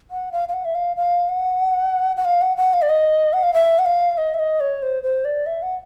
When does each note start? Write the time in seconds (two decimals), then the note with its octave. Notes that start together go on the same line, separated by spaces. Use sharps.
0.11 F#5
0.32 F5
0.49 F5
0.54 F#5
0.65 E5
0.75 F5
0.96 F5
1.29 F#5
2.17 F#5
2.25 F5
2.41 F#5
2.57 F#5
2.73 F5
2.82 D5
2.89 D#5
3.33 F#5
3.43 F5
3.54 E5
3.79 F#5
3.86 F5
4.18 D#5
4.34 E5
4.39 D#5
4.60 C#5
4.82 C5
5.03 C5
5.25 D5
5.46 E5
5.63 F#5